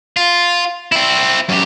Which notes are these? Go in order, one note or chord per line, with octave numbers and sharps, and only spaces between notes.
F4
C4 E4
F#2 G4